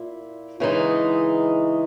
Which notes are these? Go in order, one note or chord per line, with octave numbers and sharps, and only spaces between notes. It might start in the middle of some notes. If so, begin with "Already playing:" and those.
Already playing: A#2 E4
C#3 E3 G#3 D#4